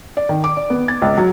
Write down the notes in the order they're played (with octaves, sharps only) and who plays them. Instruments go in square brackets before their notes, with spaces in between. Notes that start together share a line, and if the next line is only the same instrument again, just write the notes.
[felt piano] D5
D#3
D6
D5
B3
A6
C#2
F#3